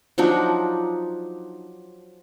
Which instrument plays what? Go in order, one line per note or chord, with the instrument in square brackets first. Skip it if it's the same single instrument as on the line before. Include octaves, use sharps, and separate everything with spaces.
[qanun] F3 F#3 D4 D#4